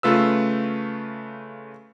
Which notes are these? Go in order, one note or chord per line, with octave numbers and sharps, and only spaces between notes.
C#3 A3 F4 B4 E6